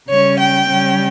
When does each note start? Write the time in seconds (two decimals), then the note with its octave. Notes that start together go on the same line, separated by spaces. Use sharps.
0.09 C#3 G3 C#4 C#5
0.38 G5
0.68 C#3 G3 C#4